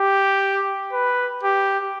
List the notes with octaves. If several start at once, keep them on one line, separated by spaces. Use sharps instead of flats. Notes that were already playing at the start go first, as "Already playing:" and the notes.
Already playing: G4
B4
G4